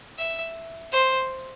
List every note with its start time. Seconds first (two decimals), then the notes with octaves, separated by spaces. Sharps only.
0.18 E5
0.92 C5